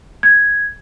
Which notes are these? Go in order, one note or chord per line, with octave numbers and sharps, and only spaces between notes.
G#6